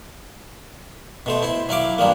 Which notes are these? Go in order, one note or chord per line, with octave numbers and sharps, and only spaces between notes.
B2 A3 C5
E4 C5
F#3 E4 F5 D6
G2 F3 G3 A#3